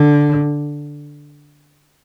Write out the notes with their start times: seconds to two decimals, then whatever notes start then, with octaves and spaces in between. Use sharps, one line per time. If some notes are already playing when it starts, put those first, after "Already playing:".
Already playing: D3